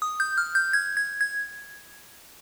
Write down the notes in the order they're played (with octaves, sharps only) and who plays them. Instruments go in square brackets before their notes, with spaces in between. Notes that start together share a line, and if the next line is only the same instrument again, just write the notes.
[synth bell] D#6
G6
F6
G6
G#6
G#6
G#6